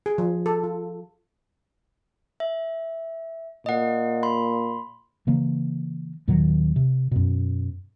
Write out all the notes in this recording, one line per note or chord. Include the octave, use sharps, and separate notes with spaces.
G#4
F3
A4
F4
E5
A#2 D#5 F#5
B5 C6
C#3 E3 A#3
D#2 A#2 D#3 F#3
C3
F#2 B2